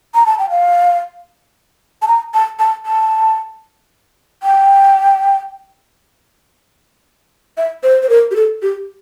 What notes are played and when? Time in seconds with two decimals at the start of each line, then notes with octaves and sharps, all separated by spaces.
0.15 A#5
0.26 A5
0.39 G5
0.50 F5
2.02 A5
2.08 A#5
2.34 A5
2.59 A5
2.86 A5
4.43 G5
7.57 E5
7.83 C5
8.03 C5
8.09 A#4
8.31 G4
8.36 A4
8.62 G4